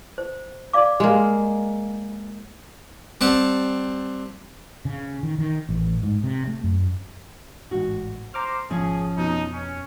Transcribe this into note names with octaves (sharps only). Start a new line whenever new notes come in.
C5
D5 F5 D6
G#3 A#3
G3 C4 F#5 A5
C#3
D#3
D#3
A1
G#2
C3
A3
F#2
A1 G#2 F#4
C5 A#5 D6 F6
G#1 C#3 F3 C#4 G#4
F2 B2 D#4
C#4